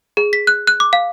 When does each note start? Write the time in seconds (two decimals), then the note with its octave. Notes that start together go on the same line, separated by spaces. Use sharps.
0.17 G#4
0.33 B6
0.47 F#6
0.67 F#6
0.80 D6
0.93 F5